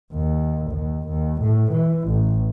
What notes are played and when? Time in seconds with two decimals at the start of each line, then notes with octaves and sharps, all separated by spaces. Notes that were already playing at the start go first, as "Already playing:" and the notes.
0.13 D#2
0.71 D#2
1.08 D#2
1.42 A2
1.72 E3
2.08 A1